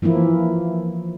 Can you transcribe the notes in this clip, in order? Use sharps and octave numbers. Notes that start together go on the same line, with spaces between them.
E3 F3 A#3 E4